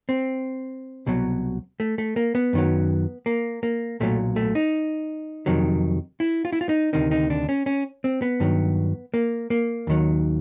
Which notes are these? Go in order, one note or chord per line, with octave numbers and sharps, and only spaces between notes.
C4
C2 B2 F#3
A3
A3
A#3
B3
F#2 D#3 F#3
A#3
A#3
B1 A#2 F#3 A3
A3
D#4
F2 C3 D#3 F#3
E4
F4
E4
F4
D#4
D2 C3 D#3 D#4
D#4
D4
C#4
C#4
C4
B3
G2 D#3 F#3
A#3
A#3
D#2 D#3 F#3